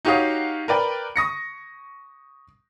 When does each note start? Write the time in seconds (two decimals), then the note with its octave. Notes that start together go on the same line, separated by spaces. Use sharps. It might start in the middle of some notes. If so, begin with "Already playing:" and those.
0.05 D#4 F#4 G4 C#5 F5 D#6
0.68 A#4 B4 D5 G5
1.16 C#6 D#6 A#6 C#7